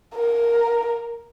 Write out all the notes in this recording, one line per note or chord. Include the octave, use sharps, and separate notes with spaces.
A#4